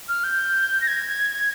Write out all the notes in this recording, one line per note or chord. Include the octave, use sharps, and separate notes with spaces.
F6
G6
A#6
G#6